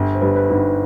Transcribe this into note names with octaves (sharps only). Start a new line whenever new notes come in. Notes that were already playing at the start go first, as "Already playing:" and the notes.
Already playing: G1
C5
G2 B4
B4
G1 D#4